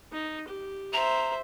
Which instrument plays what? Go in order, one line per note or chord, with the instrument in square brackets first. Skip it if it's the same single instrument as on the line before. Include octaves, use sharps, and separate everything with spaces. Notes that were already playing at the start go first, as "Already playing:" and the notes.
[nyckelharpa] D#4
G4
[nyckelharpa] C5 E5 [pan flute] A#5